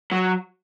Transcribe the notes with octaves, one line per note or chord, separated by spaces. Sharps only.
F#3